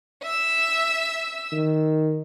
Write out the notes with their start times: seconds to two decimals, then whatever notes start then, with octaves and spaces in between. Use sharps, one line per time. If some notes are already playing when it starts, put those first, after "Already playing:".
0.22 E5 E6
1.52 D#3